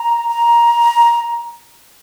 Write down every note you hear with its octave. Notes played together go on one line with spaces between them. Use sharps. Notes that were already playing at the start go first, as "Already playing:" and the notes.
Already playing: A#5
A#5